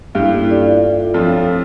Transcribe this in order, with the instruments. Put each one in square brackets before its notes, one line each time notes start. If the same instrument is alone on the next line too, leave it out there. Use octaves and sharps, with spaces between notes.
[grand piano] G2 G3 [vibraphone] A#3 C#4 E4 A4
[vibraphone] F4 A4 D5 F5
D4 F4 A4 E5
[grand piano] F2 F3 [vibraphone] F4 A4 C#5 F5
[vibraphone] A3 E4 G4